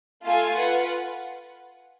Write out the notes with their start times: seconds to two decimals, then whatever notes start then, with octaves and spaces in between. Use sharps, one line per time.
0.23 A3 F4 A4 F5 G#5
0.55 F4 B4 F#5